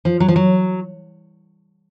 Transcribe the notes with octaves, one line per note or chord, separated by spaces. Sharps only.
F3
F#3
F3
F#3